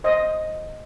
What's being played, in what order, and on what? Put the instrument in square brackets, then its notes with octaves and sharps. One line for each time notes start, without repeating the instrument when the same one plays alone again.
[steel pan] C5 D#5